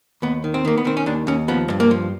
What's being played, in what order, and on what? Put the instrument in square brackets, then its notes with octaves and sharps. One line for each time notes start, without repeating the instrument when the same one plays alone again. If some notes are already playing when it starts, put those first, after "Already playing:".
[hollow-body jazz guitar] D#2 B3
D#3
C4
D#3 A#3
B3
D#3 C4
C#4
D#2 D4
D#2 C#4
F3 B3
G2
A#3
F3